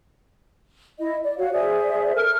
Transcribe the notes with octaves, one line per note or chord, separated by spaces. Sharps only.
E4 D#5
D5
F#4 C#5 F5
G#4 C5 D5 E5
A4 A#4 E5 F6